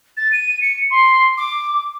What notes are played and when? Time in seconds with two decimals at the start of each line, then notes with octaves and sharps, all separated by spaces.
0.17 A6
0.32 D#7
0.62 C#7
0.91 C6
1.37 D6